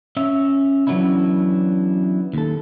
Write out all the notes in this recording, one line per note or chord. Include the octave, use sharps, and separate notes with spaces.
C#4 E5
E3 F#3 B3 C#4 D4 E4
D#2 A4